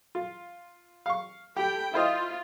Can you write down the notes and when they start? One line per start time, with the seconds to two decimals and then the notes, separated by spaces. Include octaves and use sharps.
0.15 F4
1.06 F5 C#6
1.57 G4 A4 G5 B5
1.94 E4 F4 C5 D#5